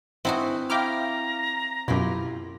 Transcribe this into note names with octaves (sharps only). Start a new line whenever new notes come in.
G#3 C4 D#4 E4 F#4 F#5
E4 E5 F5 G5 A#5 D6 F6
F#2 B2 E4 F4 G4